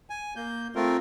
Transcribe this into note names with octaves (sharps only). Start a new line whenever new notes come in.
G#5
A#3 G6
A3 C4 F4 A#4